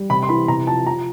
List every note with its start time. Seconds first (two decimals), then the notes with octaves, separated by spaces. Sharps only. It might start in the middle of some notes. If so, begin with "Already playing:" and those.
Already playing: G3
0.10 C3 B5
0.23 C6
0.29 E3 B5
0.48 C3 A#5
0.67 F3 A5
0.86 F3 A#5